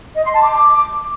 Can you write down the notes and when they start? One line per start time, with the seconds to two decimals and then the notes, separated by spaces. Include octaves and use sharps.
0.15 D#5
0.24 C6
0.33 A5
0.42 D6